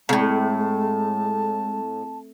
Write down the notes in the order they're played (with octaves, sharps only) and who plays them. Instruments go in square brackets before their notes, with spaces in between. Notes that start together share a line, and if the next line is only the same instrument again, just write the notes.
[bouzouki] A2 C#3 [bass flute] G#3 [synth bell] C4 [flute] A5